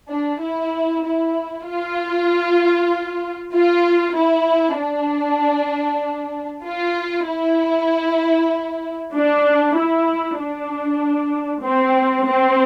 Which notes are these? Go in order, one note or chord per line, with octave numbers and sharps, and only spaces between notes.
D4
E4
E4
F4
F4
E4
D4
F4
E4
D4
E4
D4
C4
C4